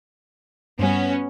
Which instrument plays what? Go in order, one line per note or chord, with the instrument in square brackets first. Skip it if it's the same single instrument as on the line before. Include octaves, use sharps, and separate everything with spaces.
[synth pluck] G2 G3 [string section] B3 C#4 F#4